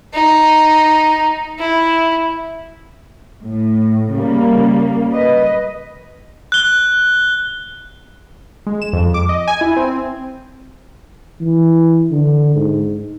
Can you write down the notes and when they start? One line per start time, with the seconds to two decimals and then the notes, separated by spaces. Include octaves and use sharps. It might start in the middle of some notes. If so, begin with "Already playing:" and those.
0.14 D#4
1.59 E4
3.44 A2
4.13 C#3 G3 A#3
5.13 B4 D#5
6.52 F#6 G7
8.67 G#3
8.82 E7
8.93 F2
9.14 D6
9.29 D#5
9.47 G#5
9.61 E4
9.76 C4
11.41 E3
12.11 D3
12.56 G#2